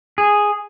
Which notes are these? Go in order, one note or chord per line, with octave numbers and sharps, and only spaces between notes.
G#4